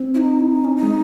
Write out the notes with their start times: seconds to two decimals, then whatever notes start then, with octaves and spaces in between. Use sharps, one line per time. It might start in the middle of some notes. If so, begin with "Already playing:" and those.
Already playing: C4
0.14 E4
0.18 D#4
0.40 E4
0.51 D#4
0.65 C#4
0.76 D#4
0.83 G#3